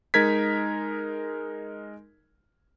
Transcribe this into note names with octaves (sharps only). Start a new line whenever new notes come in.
G#3 D#4 A#4 G#6 B6